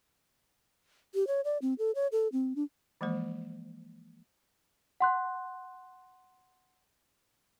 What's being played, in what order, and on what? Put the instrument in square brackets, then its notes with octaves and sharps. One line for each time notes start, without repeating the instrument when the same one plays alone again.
[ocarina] G4
C#5
D5
C4
A4
C#5
A4
C4
D4
[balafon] E3 F3 G#3 A#3 C5
[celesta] F#5 C6 F#6